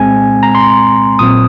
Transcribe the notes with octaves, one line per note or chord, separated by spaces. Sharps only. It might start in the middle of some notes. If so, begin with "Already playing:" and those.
Already playing: C2 A#2 G#3 C4 G#5
A#5
C6
A#1 A#2 F#3 C4 D#6